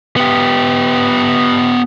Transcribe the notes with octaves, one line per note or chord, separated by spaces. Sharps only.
B3 G4